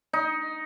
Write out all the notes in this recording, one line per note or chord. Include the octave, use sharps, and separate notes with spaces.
D#4